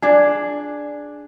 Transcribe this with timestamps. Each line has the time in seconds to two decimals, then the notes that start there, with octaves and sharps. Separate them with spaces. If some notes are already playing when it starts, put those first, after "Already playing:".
0.02 D4 G#4